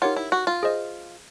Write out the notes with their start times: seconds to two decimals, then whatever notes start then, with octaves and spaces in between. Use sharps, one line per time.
0.02 D#4 F4 G4 A#4 C#5 F#5
0.17 E4
0.32 F#4
0.47 F4
0.63 G#4 C5 D#5